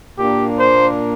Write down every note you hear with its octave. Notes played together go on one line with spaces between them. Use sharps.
A#2 A#3 D4 G4
C5